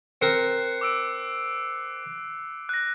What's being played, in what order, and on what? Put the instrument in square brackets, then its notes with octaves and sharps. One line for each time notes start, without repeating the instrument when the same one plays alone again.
[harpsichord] C4 A#4 [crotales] F#6 C7 C#7
[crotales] D6 E6 D7
F#6 A#6